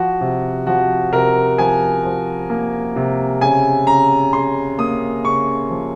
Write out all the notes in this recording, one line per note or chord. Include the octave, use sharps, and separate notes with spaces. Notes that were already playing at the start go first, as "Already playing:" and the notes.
Already playing: F3 F#4
C3
F3 F#4
C3 A#4
F3 G#5
F3
A#3
C3
C#3 G#5
C#3 A#5
C#3 C6
A#3 D#6
C#3 C#6
F3